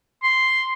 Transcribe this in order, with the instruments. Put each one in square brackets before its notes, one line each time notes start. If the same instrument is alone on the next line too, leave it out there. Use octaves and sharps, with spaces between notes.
[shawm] C6